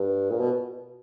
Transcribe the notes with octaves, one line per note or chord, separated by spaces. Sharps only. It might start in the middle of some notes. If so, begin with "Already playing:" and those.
Already playing: G2
A#2
B2